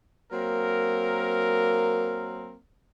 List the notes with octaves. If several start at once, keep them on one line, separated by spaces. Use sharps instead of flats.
F#3 A#3 C4 A#4